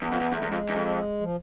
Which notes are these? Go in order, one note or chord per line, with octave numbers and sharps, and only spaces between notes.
E2 B3
F2
E2
E2 A3
E2
G#3
F2
E2
F2
F3